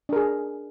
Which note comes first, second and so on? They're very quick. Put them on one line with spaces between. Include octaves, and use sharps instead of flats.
D4 A#4 G#4